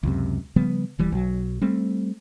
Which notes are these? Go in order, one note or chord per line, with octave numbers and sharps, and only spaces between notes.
C#2 F#2 C3
C#3 F3 G3 B3
E1 E3 G3
B1 F#3
G3 A3 C4